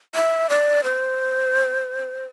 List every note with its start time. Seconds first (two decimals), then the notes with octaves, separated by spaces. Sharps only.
0.15 E5
0.50 D5
0.84 C5